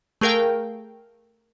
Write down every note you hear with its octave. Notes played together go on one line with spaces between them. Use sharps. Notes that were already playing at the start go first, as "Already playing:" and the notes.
A3 G#4 A#4 F5 G5